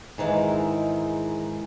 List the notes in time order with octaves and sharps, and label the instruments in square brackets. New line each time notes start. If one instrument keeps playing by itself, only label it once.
[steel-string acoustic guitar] G#2 D#3 E3 G#3